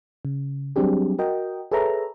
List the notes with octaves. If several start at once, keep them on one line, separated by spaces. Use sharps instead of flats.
C#3
F#3 G3 C4 D4 G4 G#4
F#4 A#4 D#5 G5
G#4 A4 B4 C#5 E5 A#5